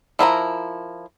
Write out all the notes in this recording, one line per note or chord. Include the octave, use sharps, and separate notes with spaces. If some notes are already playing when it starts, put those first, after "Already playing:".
F3 E4 A#4 A#5